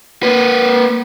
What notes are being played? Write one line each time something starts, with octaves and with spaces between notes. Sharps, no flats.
A#3 B4